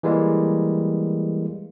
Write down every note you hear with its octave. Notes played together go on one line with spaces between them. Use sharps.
E3 G3 G#3 A#3